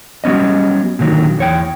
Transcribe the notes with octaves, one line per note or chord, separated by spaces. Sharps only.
F#3 G3 B3 C#4 D#5
A#2 D3 D#3 F#3
E2 C#5 G5